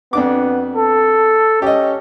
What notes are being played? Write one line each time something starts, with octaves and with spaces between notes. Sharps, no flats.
F2 B3 D4 D6
A4
C#4 G4 D#5